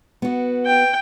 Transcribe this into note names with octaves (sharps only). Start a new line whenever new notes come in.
B3 F#4
G5